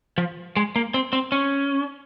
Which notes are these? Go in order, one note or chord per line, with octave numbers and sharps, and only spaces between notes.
F3
G#3
A#3
C4
C4
C#4